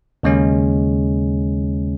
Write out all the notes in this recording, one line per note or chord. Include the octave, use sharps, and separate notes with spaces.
D#2 C#3 G#3 C#4